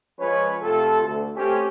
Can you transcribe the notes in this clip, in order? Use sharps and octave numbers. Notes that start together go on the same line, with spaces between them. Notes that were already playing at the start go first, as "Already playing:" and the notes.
F3 G#3 C#4 B4 C#5
C3 A3 C4 F4 A4
D2
A3 C4 C#4 G4